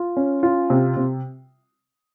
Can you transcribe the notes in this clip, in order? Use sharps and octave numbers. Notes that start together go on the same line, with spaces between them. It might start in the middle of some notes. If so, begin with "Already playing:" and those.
Already playing: F4
C#4
F4
C3
C3